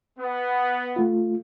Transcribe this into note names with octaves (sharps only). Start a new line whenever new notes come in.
B3
A3 F4